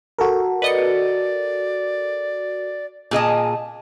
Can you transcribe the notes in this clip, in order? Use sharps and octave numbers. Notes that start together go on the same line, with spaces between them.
F#4 A4 A#4
B4 D5 D#5 C#7
A#2 G#4 D#5 A5